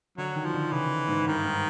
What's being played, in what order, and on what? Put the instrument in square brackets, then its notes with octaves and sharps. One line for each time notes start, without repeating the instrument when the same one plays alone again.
[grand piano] D3 [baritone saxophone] F#3
[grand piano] D#3
[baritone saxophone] F3
[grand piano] D3
[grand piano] C#3 [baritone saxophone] E3
[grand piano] G#2
[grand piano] G2 [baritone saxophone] D#3
[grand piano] G#2